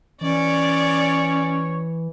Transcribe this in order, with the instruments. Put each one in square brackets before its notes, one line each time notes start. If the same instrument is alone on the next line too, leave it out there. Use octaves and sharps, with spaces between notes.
[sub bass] E3 [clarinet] C#4 [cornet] C#5 [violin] D5